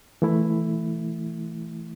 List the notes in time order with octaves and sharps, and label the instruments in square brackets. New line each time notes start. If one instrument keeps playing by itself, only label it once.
[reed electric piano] E3 A3 E4